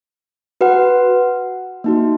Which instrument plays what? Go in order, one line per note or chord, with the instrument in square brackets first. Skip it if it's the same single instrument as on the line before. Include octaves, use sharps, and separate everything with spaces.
[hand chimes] F#4 B4 F#5
A#3 D#4 F#4